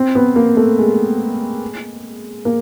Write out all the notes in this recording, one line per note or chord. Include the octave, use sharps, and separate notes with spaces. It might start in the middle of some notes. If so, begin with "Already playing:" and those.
Already playing: C4
B3
A#3
A3
G#3
A#3